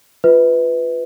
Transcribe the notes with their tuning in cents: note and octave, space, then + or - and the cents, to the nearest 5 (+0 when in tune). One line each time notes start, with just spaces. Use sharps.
F4 +0 B4 +10 E5 -45